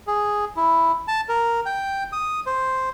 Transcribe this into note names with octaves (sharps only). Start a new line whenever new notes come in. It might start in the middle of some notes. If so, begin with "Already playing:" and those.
G#4
E4
A5
A#4
G5
D#6
C5